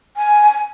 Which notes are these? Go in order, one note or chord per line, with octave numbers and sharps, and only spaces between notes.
G#5